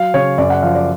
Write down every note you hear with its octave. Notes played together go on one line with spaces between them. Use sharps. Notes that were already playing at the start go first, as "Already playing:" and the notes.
Already playing: F#3 F5
C#3 C#5
F#2 D5
F#5
F3 F5
D5